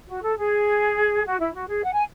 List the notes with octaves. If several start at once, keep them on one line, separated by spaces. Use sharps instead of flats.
F#4
A4
G#4
F#4
E4
F#4
G#4
F#5
G#5